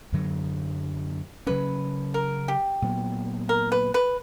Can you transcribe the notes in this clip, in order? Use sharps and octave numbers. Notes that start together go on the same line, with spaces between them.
F#2 D3 F#3
C#3 F#3 C#4 B4
A#4
G4
A#2 F#3 B3
A#4
B4
B4